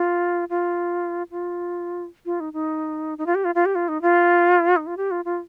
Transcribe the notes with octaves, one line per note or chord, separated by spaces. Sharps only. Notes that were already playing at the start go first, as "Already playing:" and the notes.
Already playing: F4
F4
F4
F4
D#4
D#4
D#4
F4
G4
F4
F4
G4
F4
D#4
F4
D#4
F4
G4
F4
F4